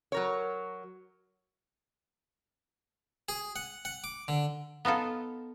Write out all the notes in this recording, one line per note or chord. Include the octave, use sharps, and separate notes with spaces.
F#3 A#4 C#5
G#4
F#5
F#5
D6
D3
B3 D#4 F4 A4